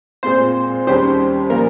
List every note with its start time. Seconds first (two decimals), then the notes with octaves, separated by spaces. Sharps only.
0.23 A#2 G#3 C4 F4 C5
0.87 D#2 D#3 G3 C#4 G4 C5
1.50 A#2 F3 A#3 A#4